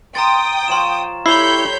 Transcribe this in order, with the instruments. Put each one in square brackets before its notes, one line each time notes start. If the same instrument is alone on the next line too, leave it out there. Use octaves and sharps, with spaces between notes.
[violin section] G5 D#6 [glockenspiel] A#5 A6 [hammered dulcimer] C6
[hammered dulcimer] F3 C#5 F5 [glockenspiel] C6 E7
[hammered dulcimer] G3 G4 A4 [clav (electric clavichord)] E4 [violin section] C#5 B5 G6 [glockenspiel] C7